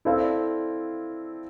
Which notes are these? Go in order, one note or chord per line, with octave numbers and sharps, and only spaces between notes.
C4 E4 A4 D5 F5